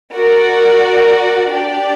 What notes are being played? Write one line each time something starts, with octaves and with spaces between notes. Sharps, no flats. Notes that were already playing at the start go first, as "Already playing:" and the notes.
F#4 A#4 D5
D4 G4 D5